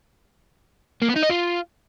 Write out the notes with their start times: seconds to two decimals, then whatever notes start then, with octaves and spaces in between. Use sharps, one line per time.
1.02 A#3
1.09 B3
1.16 D#4
1.23 D#5
1.30 F4